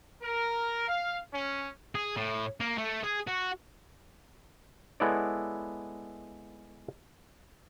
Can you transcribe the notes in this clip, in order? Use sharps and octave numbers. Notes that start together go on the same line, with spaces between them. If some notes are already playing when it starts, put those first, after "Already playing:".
A#4
F5
C#4
G#4
A2
A#3
A3
G#4
F#4
G#3 B3 E4 A4 C#5 D5